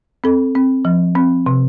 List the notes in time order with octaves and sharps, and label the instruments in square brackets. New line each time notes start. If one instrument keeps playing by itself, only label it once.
[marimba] C4 A4
C4
F3
C4
C3